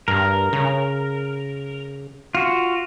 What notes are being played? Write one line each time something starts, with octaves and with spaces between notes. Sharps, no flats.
G2 A#4
C#3
F4 F#4